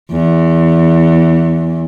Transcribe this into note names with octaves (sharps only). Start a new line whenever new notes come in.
E2